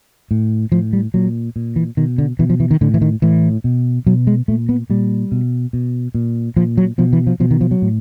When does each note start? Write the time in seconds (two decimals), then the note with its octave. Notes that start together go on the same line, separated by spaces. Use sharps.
0.31 A2
0.72 A2 F3
0.93 G3
1.14 A#2 F#3
1.56 A#2
1.76 E3
1.97 B2 D#3
2.18 D3
2.39 B2 E3
2.50 F3
2.60 E3
2.71 D#3
2.81 A2 D3
2.94 E3
3.02 D#3
3.22 A2 E3
3.64 B2
4.06 B2 F#3
4.27 G#3
4.48 A#2 A3
4.69 B3
4.90 A#2 G3
5.32 B2
5.73 B2
6.15 A#2
6.57 A#2 F3
6.78 F#3
6.98 B2 F3
7.13 E3
7.27 F3
7.40 B2 F3
7.51 D#3
7.61 F3
7.71 F#3
7.82 A2